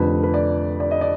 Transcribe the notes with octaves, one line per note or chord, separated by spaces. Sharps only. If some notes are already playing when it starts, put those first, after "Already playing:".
Already playing: F1 F2 D3 B4
B4
D5
D5
D#5
D5